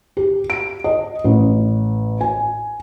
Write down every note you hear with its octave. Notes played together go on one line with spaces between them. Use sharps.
G4
D7
D#5
A1
G#5